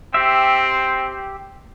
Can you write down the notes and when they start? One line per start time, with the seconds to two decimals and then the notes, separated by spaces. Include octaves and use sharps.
0.14 C4 G4 E5